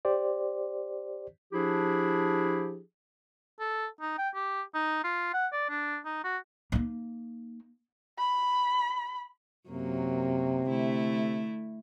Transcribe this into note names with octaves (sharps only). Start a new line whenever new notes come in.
G4 C5 D5
F3 D4 E4 G4 G#4
A4
D#4
G5
G4
D#4
F4
F#5
D5
D4
D#4
F#4
A#3 D#4
B5
F#2 C3 F#3 A#3
D3 A3 E4